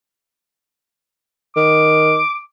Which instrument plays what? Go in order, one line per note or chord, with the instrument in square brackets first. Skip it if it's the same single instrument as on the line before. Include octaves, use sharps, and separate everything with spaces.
[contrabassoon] D#3 [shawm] D6